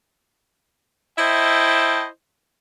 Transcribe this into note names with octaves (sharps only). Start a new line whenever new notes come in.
E4 C5 D#5 E5 G5 A5